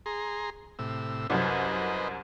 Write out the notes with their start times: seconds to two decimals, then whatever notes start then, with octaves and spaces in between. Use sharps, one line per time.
0.06 G#4 A#5 C6
0.79 A2 C3 E6
1.30 C2 F#2 B4 C5 D#5